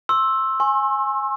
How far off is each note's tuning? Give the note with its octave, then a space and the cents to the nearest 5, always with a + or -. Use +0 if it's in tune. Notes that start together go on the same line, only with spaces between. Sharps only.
C6 +25 E6 +0
G#5 +0 C6 +45